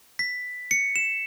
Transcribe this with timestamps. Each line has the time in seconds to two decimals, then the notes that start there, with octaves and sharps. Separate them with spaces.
0.19 B6
0.71 C#7
0.96 E7